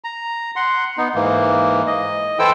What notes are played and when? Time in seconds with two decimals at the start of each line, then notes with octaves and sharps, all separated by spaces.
0.04 A#5
0.56 F#5 C6
0.98 B3 D#4
1.15 G#2 E3 A#3
1.87 D#5
2.39 E3 E4 A4 C5 G5 E6